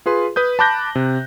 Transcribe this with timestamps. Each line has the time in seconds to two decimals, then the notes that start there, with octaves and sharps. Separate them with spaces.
0.06 F4 G#4 B4 C6
0.36 B4 D#6 G6
0.59 A5 B5 D6 F#6 G6 A#6
0.95 C3